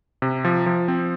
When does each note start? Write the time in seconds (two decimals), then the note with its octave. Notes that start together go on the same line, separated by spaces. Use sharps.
0.22 C3
0.45 F3
0.66 F3
0.88 C4